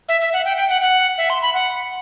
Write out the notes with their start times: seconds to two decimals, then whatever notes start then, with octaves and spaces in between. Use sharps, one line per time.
0.09 E5
0.21 E5
0.33 F#5
0.45 G5
0.57 G5
0.69 F#5
0.81 F#5
1.18 E5
1.30 C6
1.42 B5
1.54 F#5